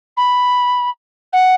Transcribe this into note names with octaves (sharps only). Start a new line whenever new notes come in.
B5
F#5